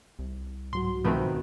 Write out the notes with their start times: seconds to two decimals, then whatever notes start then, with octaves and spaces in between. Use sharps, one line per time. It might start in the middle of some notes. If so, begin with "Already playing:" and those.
0.19 C2
0.73 G#2 F#3 F#4 C6
1.04 B2 D#3 F3 A3 C4 B4